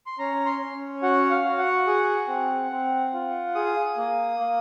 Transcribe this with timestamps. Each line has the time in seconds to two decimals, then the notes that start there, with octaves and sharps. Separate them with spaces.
0.06 C6
0.19 C#4 A#5
0.46 C6
0.61 C#4
1.02 F#4 F#5
1.30 F5
1.45 F#4
1.58 F#5
1.87 G#4
2.28 C4
2.71 C4
3.13 F4
3.55 G#4 D#6
3.97 A#3
4.39 A#3